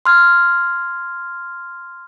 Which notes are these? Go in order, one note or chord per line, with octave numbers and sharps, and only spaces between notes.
C6 F6 G#6